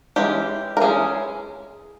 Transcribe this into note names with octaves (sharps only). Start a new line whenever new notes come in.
E3 G#3 C#4 G4
A#4
E3 G#3 C#4 G#4